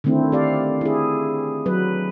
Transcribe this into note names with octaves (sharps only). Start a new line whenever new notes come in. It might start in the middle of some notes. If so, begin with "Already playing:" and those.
D3 D#3 A3 C4 E4
G4 D5 F5
E4 G#4
F#3 B4